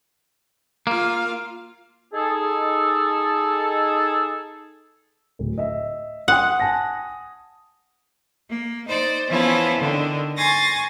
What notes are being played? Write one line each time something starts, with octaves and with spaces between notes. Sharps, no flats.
A#3 F4 F5
D#4 G#4 A4
D1
D#5 E5
F#5 G5 C6 D#6
G#5 A5 A#6
A#3
D#4 C5 D5
E3 F3 B3 C#4 E4 F4
D3 D#3
G#5 C6 C#6 A6 A#6